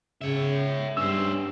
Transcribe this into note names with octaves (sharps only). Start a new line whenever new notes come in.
C#3 C#5 E5
G2 C#4 C5 E6